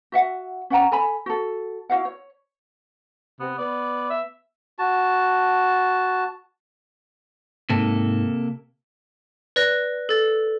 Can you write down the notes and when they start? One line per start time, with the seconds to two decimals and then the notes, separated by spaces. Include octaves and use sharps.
0.12 F#4 E5 F#5
0.70 C#4 F#5 G5 A#5
0.92 A4 G#5 B5
1.26 F#4 A4
1.89 E4 F#4 F5 F#5
2.05 C#5
3.40 C3 B3
3.58 B3 D5
4.10 E5
4.79 F#4 A5
7.70 G#2 C3 A#3 A4
9.56 B4 D5 F#6 A#6
10.09 A4 A6